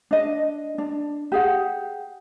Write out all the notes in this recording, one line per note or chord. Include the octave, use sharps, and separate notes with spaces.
D4 D#5
D4
G4 G#4 F#5